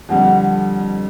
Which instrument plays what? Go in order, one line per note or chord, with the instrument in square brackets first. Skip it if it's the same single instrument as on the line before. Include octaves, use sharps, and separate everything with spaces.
[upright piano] F2 D3 G3 [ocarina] F#5